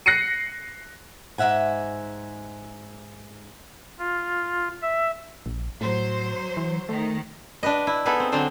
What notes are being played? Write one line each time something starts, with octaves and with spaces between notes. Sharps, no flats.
F#6 A#6 C7 C#7 D#7
G#2 F#3 E5 F#5 G#5
F4
E5
A#1
A2 F#3 C5
E3
D#3 A3
D4 G4 B4 D#5
E4
B3 D#4 G#4 A4 B4
C4
D3 F#3 C4 D4 C5